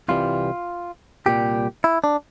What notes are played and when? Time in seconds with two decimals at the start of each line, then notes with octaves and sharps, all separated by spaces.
0.08 C2 C3 E3 G3 F4
1.26 C2 A#2 G3 G4
1.84 E4
2.04 D4